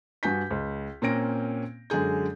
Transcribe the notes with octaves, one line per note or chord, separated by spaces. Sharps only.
G2 F#4 G#5 G6 B6
C#2
A#2 A#3 C4 C#4 A#6 D7
F#2 D3 G#3 G#4 G6